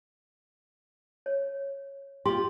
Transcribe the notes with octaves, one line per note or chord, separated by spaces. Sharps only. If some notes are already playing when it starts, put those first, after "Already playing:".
C#5
F4 G4 C6